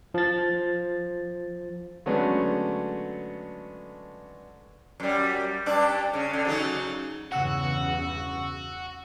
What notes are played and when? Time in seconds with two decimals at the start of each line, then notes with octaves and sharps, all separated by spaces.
0.14 F3 A6
2.06 D3 F#3 G#3 A3 B3 C#4
5.00 F#2 G3
5.66 G2 D4
6.13 C#3
6.33 D3
6.45 C#3 F#3 D#4
7.32 E2 G2 C#3 F#4 F#5 E6